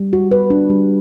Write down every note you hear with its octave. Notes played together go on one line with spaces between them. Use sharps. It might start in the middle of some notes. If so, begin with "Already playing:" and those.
Already playing: G3
F#4
B4
D4
G3